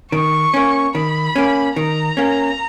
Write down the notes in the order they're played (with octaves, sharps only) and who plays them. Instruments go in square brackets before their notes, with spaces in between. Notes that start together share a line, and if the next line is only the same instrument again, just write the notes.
[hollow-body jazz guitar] D#3 [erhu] C#6
[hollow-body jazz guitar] A#3 C#4
[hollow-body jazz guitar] D#3 [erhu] B5
[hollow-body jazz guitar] A#3 C#4
[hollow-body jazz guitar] D#3 [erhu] A#5
[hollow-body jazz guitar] A#3 C#4